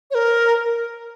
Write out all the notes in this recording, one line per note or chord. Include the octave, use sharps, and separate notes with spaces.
C#5
A#4